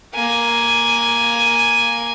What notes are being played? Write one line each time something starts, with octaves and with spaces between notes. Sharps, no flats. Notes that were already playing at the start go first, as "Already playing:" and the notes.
A#3 G#5